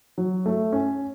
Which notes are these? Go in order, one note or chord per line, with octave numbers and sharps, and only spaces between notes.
F#3
A3
C#4